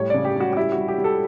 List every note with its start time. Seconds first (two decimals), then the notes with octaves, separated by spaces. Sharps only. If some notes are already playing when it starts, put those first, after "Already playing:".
Already playing: A2 G3 C#5
0.10 C#3 D5
0.25 G4
0.36 G3 F#4
0.53 F#4
0.57 G3 E4
0.72 F#4
0.78 G3
0.88 G4
0.98 G3
1.04 A4